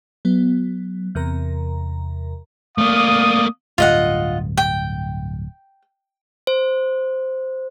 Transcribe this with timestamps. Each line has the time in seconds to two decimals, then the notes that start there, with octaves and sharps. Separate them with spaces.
0.25 F#3 B3
1.15 E2 C3 A#4 A#5
2.78 A3 A#3 D5 F5 D#6
3.78 D1 G2 F4 D#5 F#5
4.57 G5
6.47 C5